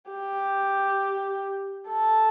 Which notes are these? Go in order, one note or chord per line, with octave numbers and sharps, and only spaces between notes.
G4
A4